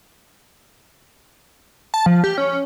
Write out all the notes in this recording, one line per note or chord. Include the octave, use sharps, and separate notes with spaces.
A5
F3
G4
C#4